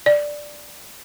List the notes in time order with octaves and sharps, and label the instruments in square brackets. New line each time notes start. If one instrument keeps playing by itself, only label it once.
[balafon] D5